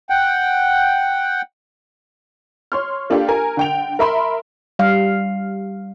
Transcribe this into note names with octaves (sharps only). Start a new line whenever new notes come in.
F#5 G5
C#5 C6 F6
A#3 D4 F4 G4 A4
A#4 G#5
D3 G5 F7
A#4 E5 B5 C6
G3 F5